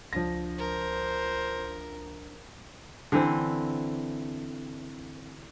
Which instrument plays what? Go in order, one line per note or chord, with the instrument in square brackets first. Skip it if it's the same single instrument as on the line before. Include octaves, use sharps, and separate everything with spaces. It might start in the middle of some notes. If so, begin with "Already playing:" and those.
[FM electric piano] C#2 D4 [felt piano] F3 A#6
[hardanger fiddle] A#4 [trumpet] C5
[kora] D3 E3 C4